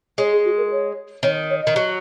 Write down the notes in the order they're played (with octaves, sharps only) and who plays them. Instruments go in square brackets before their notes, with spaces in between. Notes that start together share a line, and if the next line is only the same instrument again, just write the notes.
[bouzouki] G#3 [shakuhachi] C#5
[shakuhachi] G#4
F#4
A#4
C#5
[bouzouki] D#3 [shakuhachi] C#5
[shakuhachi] C#5
[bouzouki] D#3 [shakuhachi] D#5
[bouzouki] F#3